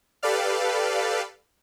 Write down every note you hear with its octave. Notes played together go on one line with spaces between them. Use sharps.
G4 A4 B4 D5 F5